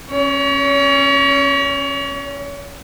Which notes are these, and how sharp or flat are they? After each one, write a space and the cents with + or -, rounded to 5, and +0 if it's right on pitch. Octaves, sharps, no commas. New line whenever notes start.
C#4 -15 C#5 +35